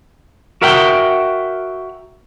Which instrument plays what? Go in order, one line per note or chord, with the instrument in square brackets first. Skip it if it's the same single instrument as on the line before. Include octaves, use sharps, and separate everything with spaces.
[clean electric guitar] F#4 A#4 E5 F#5 G5